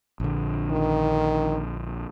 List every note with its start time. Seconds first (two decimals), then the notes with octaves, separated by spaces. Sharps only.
0.20 A#1 D3
0.71 D#3